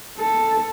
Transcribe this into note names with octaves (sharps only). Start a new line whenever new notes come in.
A4